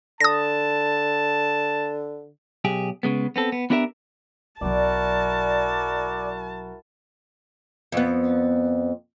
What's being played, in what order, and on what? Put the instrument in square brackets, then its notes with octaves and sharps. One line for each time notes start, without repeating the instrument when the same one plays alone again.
[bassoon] D3 [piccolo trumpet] A5 [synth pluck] D#6 A#6
[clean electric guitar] B1 G4 G#4
C#3 G#3 B3
B3 C4 A4
B3
B3 D4 E4 G4 A#4 E5
[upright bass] B1 F#3 [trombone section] E4 F#4 A#4 [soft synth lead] D5 [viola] A5
[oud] F2 B3